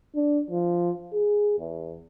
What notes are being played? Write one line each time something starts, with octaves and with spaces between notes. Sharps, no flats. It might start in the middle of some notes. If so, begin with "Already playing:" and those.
D4
F3
G#4
E2